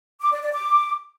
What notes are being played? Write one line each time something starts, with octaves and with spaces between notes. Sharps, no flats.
D6
D5
D5
D6